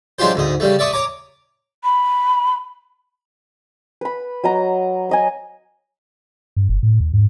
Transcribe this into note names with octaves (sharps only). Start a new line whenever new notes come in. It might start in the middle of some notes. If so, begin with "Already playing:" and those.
F#3 G#3 D4 F4 G4 C5
D2 G#2 D#5
C#3 G3 A3
D5 E5 C#6 D#6
C#5 A#5 D6
B5
B4 B5
F#3 D#5 A#5
C#5 D#5 G#5
G2
F#1
A2
D#2
G#2